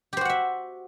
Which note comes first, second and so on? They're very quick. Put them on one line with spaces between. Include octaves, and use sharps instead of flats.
G4 C5 F#4 F#5 E5